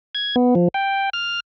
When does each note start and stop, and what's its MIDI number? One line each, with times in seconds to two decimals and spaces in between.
0.15 0.36 92
0.36 0.55 59
0.55 0.68 53
0.74 1.10 79
1.13 1.40 89